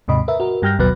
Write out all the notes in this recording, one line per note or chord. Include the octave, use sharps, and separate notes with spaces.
D#2 G#2 C3 D#5 B5
A#4 B4 E5
F#4 A#4
G2 G3 G5 F6 G6 A#6
A1 D#2 B2 F#3 B4 F#6